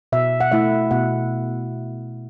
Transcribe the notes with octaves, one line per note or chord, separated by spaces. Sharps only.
B2 E5
F#5
A3 E4 E5
B2 F#5